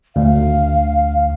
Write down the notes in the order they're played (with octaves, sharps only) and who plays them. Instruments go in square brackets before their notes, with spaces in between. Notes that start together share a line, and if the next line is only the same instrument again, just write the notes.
[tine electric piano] D2 [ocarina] F5